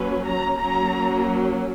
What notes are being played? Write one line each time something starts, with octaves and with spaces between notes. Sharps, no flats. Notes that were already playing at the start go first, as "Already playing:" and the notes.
Already playing: F#3 A#3 C#4 B4
A#5
F#3 A#3 C#4 A#5